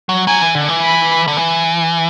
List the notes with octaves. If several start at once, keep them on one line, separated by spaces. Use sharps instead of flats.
F#3
F#3 G#5
E3
D3
E3
B5
D3
E3